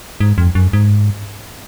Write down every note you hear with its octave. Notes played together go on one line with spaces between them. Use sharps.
G#2
F2
F#2
G#2